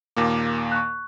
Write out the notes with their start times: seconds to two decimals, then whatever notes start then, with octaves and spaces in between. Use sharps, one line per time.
0.16 D#2 A#2 A#3 D6
0.72 C#6 F#6